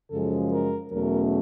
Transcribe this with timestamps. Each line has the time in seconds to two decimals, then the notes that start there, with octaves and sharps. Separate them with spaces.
0.10 F#2 C#3 F3 G#3 A4
0.52 A#4
0.92 E2 B2 F#3 A3 C#4 A#4